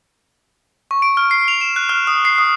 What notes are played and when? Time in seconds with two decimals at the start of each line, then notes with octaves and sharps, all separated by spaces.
0.91 C#6
1.02 D7
1.17 F6
1.31 C7
1.48 F7
1.61 E7
1.76 F#6
1.89 F6
2.07 D#6
2.25 C7
2.38 D#6